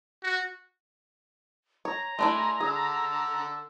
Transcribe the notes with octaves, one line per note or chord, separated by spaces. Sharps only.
F#4
C#5 A#5
A3 D4 E4 G#5 C6
D3 G#4 E6